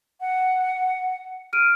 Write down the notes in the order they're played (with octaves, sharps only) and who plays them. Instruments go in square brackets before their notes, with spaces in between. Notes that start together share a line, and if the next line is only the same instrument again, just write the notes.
[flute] F#5
[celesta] F6 D7 D#7